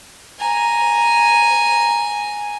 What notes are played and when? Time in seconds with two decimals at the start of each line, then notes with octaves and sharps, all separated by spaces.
0.39 G#5 A#5